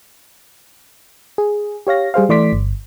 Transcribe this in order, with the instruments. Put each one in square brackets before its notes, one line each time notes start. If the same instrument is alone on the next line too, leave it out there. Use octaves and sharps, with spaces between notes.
[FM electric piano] G#4
G4 C#5 F5 A#6
G3 G#4 C5 F5
E3 A3 D5 C6 D6 B6
G1